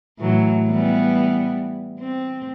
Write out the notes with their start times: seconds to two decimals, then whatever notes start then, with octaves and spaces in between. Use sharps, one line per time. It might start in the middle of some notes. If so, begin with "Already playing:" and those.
0.19 A2 E3 F#3
0.65 E3 G3 B3
2.00 C4